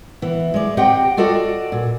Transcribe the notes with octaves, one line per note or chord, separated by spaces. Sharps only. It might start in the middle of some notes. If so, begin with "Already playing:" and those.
E3 B3
G#3 D5
C4 G4 D#5 F#5 G5
F4 F#4 A4 D5 D#5 F#5
A#2